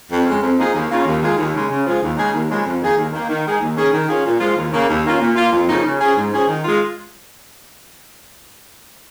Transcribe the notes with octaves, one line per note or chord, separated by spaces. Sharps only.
F2
C#3 G#3
F2
F3 A#3 D#4 G#4
D#2
C#3 A#3 C#4 F4
D#2
D#3 G#3 F4 G#4
D#2
C#3 G#3
C#3
F3 G#3 F4 G#4
D#2
C#3 G#3 D#4 G#4
D#2
C#3 F3 G#3
F2
D#3 A#3 D#4 G#4
D#2
D#3 A#3
D#3
G#3 D#4 G#4
D#2
D#3 C#4 G#4
D#3
C#4 F4 G#4
A#2
F3 G#3 F4
D#2
C#3 A#3
D#2
D#3 A#3 C#4 F4
A#2
A#3 F4
F2
C#3 F3 A#3 D#4
C#3
F3 C#4 G#4
G#2
F3 C#4 G#4
D#3
G#3 F4